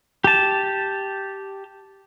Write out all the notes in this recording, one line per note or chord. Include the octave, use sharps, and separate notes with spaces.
G4 A5